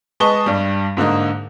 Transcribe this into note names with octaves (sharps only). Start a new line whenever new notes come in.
G#3 B4 D#5 A5 C#6 G7
G2 G3
G#2 D3 A#3 D#4